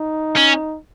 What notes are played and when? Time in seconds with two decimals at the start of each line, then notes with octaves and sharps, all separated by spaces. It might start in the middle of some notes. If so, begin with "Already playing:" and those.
Already playing: D#4
0.37 C#4